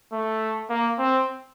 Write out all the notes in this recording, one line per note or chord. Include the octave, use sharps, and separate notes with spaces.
A3
A#3
C4